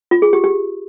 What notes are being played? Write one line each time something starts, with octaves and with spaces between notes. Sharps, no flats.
F4
G#4
G4
G4